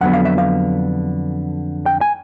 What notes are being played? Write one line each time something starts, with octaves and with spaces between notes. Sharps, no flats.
F2 D3 F#3 B3 F#5
F5
E5
F5
G5
G#5